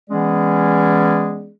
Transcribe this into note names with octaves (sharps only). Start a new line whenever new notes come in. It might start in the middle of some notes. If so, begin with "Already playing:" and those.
E3 G#3 B3 C#4 G#4 D5